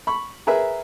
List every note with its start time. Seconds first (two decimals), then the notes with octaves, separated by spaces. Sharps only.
0.07 B5 C#6
0.47 G#4 A#4 B4 E5